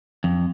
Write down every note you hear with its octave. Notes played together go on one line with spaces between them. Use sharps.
F2